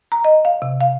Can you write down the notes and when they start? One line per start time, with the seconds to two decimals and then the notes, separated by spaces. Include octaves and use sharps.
0.12 A#5
0.25 D#5
0.45 F5
0.62 C3
0.81 F5